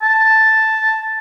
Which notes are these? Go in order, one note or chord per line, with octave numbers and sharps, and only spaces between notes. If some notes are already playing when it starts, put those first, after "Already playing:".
A5